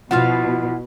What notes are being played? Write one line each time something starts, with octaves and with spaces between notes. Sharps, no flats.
B2 F3 E4 F4 F5 F#5 F6